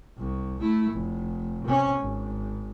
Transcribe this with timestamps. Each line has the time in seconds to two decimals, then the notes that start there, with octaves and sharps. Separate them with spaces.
0.17 C2
0.60 A3 E4
0.91 F1
1.65 C3 C#4
1.99 G#1